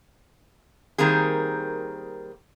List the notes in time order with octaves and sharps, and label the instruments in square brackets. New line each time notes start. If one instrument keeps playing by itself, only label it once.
[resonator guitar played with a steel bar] D#3 G3 A#3 C4 G#4